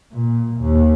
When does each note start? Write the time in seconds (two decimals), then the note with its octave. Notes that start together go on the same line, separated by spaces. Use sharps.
0.12 A#2
0.61 D#2